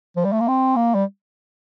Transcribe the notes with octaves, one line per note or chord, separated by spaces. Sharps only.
F3
G3
A3
A#3
C4
A#3
G3